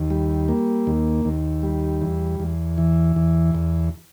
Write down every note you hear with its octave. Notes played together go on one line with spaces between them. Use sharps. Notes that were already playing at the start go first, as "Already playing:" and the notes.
Already playing: D#2
G3
A#3
D#2
D#2
G3
E2
E2
E3
E2
E2